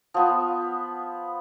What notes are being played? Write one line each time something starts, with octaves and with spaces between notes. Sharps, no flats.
F3 B3